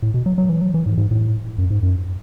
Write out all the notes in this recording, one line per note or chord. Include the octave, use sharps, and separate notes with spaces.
A2
B2
F#3
F#3
E3
F#3
E3
G#2
G#2
A2
F#2
G#2
F#2